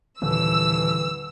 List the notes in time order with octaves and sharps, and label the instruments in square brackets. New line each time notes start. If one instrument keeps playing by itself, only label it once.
[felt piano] D#1 [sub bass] D3 [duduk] E3 [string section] E6